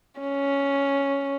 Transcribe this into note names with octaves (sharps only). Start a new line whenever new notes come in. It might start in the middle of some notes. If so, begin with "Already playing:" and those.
C#4